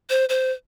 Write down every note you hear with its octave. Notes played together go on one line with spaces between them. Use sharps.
C5
C5